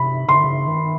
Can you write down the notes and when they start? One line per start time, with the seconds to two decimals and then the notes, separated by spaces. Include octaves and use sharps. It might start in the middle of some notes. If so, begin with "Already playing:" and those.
Already playing: C3 B5
0.29 C#3 C6
0.36 D3
0.44 C#3
0.67 D#3